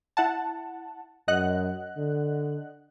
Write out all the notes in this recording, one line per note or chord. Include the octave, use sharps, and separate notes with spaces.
E4 F#5 A5
F#2 D#5 F#5 F#6
D3